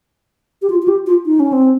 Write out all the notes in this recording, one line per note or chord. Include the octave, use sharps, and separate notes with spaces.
G4
F4
F4
G4
F4
D#4
C#4
C4